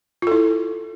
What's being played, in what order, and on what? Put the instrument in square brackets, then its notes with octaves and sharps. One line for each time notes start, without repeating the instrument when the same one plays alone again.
[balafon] F4
A4
E4